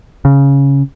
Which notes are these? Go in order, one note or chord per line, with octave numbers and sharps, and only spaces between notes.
C#3